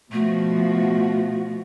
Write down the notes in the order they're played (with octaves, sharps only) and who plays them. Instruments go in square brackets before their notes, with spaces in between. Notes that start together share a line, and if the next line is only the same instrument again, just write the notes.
[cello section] B2 F3 F#4 [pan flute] A3